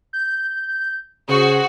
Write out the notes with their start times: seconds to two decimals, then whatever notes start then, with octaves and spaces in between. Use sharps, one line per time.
0.13 G6
1.29 C#3 F#4 G#4 C5